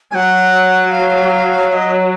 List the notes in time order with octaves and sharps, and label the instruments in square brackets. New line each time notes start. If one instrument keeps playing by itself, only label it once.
[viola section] F#3 [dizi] F#5 G#5
[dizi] F5
F5
D#5